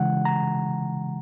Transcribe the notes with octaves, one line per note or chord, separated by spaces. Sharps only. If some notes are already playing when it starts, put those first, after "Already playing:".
Already playing: C#3 E3 G#3 F#5
A#5